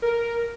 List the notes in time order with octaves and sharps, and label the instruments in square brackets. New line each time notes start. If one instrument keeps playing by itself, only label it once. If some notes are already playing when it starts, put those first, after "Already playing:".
[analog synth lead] A#4